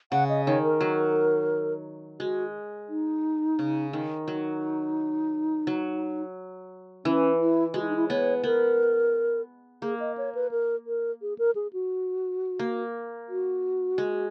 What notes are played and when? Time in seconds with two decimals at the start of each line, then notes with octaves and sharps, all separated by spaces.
0.12 C#3 F#5
0.29 D#5
0.47 D#3 C#5
0.64 A#4
0.81 F#3
2.20 G#3 F#4
2.89 D#4
3.59 C#3
3.93 D#3
4.28 F#3 D#4
5.67 F#3
7.05 E3 C#4
7.40 E4
7.74 G#3 F#4
7.82 E4
7.89 D#4
7.96 E4
8.10 B3 C#5
8.44 B3 A#4
9.82 A#3 G#4
10.00 D#5
10.18 C#5
10.35 B4
10.51 A#4
10.87 A#4
11.22 G#4
11.39 A#4
11.55 G#4
11.73 F#4
12.59 A#3
13.29 F#4
13.98 G#3